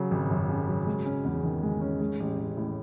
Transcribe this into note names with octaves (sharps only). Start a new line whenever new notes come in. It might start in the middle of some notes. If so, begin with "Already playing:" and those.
Already playing: C#3 F#3
G#1
F#2
C#3
F#3
G#3
C#4
E2
D#3
G#3
C#4
G#3
A1
A1
A2